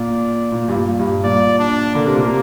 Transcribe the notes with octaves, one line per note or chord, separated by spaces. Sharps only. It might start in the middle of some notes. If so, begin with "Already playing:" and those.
Already playing: A#2 D5
A#2
G2
A#2
G2
A#2 D5
D4
D3 A#3
C3
A#2
C3